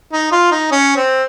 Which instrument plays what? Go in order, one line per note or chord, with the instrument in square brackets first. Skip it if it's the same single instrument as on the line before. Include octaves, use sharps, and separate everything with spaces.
[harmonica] D#4
F4
D#4
C#4
C4